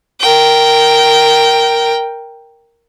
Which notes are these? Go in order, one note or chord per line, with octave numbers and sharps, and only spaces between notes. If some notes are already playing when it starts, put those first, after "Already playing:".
A#4 G5